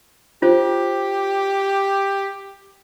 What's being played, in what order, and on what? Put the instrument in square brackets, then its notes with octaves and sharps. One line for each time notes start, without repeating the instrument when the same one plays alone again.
[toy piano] F4 C5 [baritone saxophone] G4